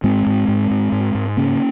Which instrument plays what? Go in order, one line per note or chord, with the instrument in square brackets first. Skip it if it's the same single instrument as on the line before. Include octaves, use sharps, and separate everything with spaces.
[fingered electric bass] G#2 G#3 C4
G#2
G#2
G#2
G#2
G#2
C#3 A#3 C#4